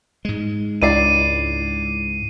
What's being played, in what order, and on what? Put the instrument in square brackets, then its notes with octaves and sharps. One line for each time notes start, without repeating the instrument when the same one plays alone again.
[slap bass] G#2 G#3
[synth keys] C#2 [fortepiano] D4 E4 D5 [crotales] C7 D#7